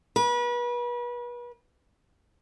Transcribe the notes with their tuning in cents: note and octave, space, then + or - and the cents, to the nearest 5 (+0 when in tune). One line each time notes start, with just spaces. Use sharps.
B4 -35